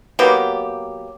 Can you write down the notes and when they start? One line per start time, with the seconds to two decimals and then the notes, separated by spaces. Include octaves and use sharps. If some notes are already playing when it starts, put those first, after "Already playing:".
0.19 F#3 A#3 B3 G4